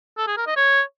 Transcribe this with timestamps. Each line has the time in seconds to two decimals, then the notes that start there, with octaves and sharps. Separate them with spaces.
0.17 A4
0.27 G#4
0.37 A#4
0.47 D#5
0.57 C#5